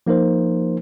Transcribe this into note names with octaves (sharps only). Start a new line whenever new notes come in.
F3 A#3 D#4 A#4 C5